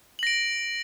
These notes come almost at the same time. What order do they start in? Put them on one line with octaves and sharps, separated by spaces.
F#7 A#6 D7